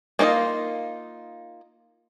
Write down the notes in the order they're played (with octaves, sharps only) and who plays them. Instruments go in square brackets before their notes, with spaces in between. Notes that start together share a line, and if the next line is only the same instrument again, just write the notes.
[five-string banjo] A#3 D4 D#4 F4 D#5